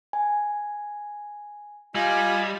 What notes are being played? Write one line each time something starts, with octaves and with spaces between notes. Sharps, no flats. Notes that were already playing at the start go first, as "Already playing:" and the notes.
G#5
G3 F4 D#5 G#5